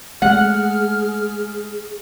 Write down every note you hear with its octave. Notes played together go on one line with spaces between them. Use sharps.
G#3 A3 G#4 F#5 F6